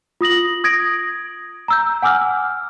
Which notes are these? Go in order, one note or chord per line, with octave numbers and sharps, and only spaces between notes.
F4 D#6 A#6 F#7
D#6 G#6 A#6 D7
A#5 E6 G6
F#5 G#5 D6 E6 F6